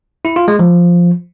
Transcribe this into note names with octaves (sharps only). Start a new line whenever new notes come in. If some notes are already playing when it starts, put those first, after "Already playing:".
E4
F4
G#3
F3